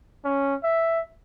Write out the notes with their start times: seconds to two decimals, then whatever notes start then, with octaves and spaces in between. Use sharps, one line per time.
0.25 C#4
0.64 E5